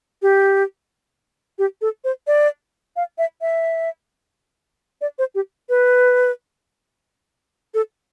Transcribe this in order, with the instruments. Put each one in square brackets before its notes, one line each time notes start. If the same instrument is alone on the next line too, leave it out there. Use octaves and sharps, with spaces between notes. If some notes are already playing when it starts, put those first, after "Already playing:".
[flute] G4
G4
A4
C5
D5
F5
E5
E5
D5
C5
G4
B4
A4